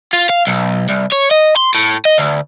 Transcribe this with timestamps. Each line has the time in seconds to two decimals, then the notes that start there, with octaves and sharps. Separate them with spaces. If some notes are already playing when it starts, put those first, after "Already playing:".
0.13 F4
0.30 F5
0.47 B1
0.89 C2
1.12 C#5
1.31 D#5
1.56 C6
1.74 A2
2.05 D#5
2.18 D2